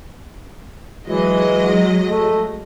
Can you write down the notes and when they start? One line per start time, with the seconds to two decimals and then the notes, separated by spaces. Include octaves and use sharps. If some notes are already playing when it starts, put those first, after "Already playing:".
1.07 E3 F#3 G#3 D#5
2.06 A3